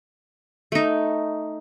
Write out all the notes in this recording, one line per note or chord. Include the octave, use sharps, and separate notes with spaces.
A3 D#4